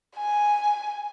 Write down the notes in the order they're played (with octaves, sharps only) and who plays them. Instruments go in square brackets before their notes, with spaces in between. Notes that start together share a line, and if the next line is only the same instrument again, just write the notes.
[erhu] G#5